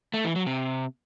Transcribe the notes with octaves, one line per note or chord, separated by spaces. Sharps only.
A3
E3
F#3
C3